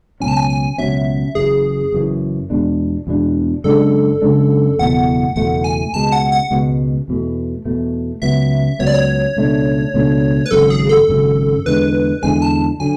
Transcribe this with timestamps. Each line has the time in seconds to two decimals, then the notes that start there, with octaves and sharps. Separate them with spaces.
0.20 C#2 B2 F#3 C#4 G#5
0.28 A5
0.36 G#5
0.50 G#5
0.78 C#2 B2 F#3 C#4 E5
1.35 F#1 F#2 E3 G#4
1.92 F#1 F#2 E3
2.50 E2 B2 G#3 D4
3.07 E2 B2 G#3 D4
3.64 F#2 C#3 G#3 D4 A4
4.22 F#2 C#3 G#3 D4
4.79 F#1 E2 B2 A3 F#5
5.36 F#1 E2 B2 A3 F#5
5.64 G#5
5.93 C#2 B2 G#3 A5
6.12 F#5
6.32 F#5
6.51 C#2 B2 G#3
7.08 E2 B2 A3
7.65 E2 B2 A3
8.22 C#2 C#3 F#3 B3 E5
8.79 C#2 C#3 F#3 B3 C#5
8.87 D5
8.94 C#5
9.37 C#2 B2 A3 D4
9.94 C#2 B2 A3 D4
10.46 B4
10.51 G#1 F#2 C#3 F#3 A4
10.70 G#4
10.89 A4
11.08 G#1 F#2 C#3 F#3
11.66 E2 D3 G#3 B4
12.23 E2 D3 G#3 G#5
12.42 A5
12.80 D3 F#3 G#5